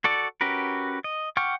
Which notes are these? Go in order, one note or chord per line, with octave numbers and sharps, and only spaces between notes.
F#4 A4 D5
C#4 F#4 G4 A#4 B4
D#5
F#5 G5 C#6 D6 F6